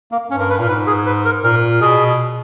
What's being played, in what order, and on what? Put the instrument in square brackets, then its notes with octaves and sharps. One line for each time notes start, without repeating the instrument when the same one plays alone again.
[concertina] A#3
[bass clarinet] G2 [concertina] C#4
[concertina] A#4
B4
[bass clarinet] A#2 [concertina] A#4
[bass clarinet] G#2 [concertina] B4
[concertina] G#4
B4
A#4
[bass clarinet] A#2 [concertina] A#4
[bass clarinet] B2 [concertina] G#4